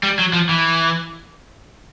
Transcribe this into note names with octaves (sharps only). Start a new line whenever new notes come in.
G3
F#3
F3
E3